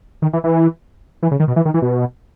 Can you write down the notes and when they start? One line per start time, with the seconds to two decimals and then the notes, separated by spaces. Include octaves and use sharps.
0.22 D#3
0.33 E3
0.44 E3
1.23 E3
1.31 C#3
1.40 D#3
1.48 B2
1.56 E3
1.65 D#3
1.74 E3
1.82 B2